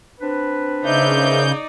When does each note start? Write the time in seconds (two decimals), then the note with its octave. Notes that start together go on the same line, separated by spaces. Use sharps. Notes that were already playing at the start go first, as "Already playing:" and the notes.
0.20 C4 D4 B4
0.85 C#3 A#3 D#4 C5 D5 E5 G6